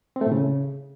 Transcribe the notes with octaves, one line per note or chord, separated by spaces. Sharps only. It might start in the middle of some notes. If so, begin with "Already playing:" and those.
C4
A3
A2
C#3